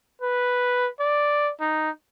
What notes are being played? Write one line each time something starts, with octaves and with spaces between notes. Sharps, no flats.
B4
D5
D#4